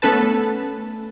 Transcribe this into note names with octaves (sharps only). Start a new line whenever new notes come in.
A3 B3 C#4 A4 B4 A5